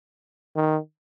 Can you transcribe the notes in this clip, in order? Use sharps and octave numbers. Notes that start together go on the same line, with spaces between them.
D#3